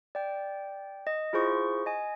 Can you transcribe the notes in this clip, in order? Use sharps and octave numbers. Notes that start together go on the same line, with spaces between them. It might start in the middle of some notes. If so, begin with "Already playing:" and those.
D5 G5
D#5
E4 F4 G#4 C5 C#6
D#5 G#5